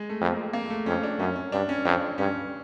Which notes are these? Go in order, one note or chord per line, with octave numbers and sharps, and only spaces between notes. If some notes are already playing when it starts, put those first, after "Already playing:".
Already playing: G#3
A3
F2
A#3
A#3
A3
F2 C#4
D4
F#2 C#4
C#4
G2 D4
C#4
F2 D4
G2 C#4